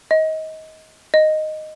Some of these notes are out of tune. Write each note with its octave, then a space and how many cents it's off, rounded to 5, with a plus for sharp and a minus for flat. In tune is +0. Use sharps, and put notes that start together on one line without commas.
D#5 +25
D#5 -5